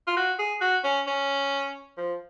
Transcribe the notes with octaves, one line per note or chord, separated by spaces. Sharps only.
F4
F#4
G#4
F#4
C#4
C#4
F3